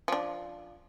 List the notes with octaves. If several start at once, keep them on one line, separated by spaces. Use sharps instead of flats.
F3 D4